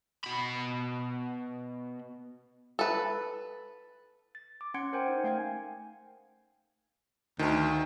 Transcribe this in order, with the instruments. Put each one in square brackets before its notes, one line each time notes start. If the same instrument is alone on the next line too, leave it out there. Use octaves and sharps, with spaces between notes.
[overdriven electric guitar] B2 B5
[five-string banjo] A4 B4
[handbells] A6
D6
C#4 F#5 C6 G#6 C#7 D7
A#4 C5 G5 G#5
D#4
A3 F5 G5 G#5 G#6
[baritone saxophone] D2 [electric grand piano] D#3